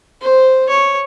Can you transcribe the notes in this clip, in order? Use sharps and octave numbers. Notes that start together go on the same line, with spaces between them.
C5
C#5